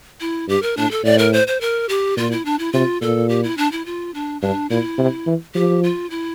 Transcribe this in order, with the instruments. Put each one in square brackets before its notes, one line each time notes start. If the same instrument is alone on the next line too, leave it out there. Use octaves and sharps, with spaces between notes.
[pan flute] E4
[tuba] G2 [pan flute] G4
[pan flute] A#4
[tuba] A2 [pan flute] D4
[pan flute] A4
[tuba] A2 [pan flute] D5
[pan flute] A#4
C5
C5
A#4
G4
[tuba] A#2 [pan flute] F4
[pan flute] E4
D4
E4
[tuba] C3 [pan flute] F4
[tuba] A#2 [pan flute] A4
[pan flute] G4
E4
D4
E4
F4
D4
[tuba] G2 [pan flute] D4
[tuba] A#2 [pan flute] E4
[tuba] C3
E3
[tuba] F3 [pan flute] G4
[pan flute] F4
E4